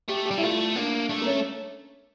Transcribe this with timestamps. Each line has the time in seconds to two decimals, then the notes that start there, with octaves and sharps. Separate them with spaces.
0.09 A3 G4
0.25 G4
0.31 G3
0.38 E4
0.43 A3 F4
0.76 A#3 D4
1.09 A3 D4
1.22 A#3
1.26 C#4